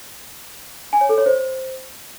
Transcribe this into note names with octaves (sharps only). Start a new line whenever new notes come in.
G#5
C#5
A4
C#5
C5